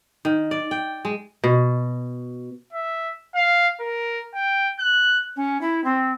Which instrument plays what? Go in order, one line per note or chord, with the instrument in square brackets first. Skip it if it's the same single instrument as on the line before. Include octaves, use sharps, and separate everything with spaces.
[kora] D#3
D5
G5
G#3
B2
[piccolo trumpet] E5
F5
A#4
G5
F#6
[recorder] C#4
E4
C4